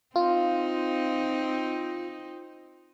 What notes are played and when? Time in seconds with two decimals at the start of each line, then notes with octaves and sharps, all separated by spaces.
0.16 C4 D#4 F4